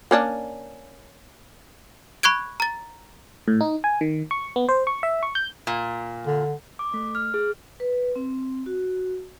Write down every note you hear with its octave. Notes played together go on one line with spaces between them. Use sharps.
A#3 C#4 D4
B5 C#6 F#6 G#6 D7
A#5 A6
A2
D#4
G#5
D#3
C#6
B3
C5
C#6
E5
C#6
G6
A#2
D3
D6
A3
F6
G#4
B4
C4
F#4